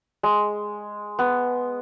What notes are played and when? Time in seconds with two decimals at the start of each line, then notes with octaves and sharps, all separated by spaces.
0.23 G#3
1.19 B3